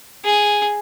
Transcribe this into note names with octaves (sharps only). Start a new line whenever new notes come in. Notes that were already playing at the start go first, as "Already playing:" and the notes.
G#4